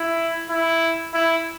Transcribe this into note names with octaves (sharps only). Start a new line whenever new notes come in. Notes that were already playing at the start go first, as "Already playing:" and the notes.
Already playing: E4
E4
E4